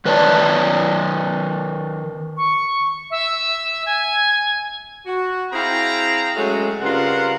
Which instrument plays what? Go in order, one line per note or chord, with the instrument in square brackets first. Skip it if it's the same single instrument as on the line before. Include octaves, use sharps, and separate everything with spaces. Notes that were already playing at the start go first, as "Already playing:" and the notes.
[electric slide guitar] D#3 B4 C#5 D5 A5
[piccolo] C#6
E5
G#5
[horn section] F#4
C4 E4 G#4 F5 G5 A#5
F#3 G#3 A3 C#4 F#4
G2 C#3 C4 F4 A#4 F#5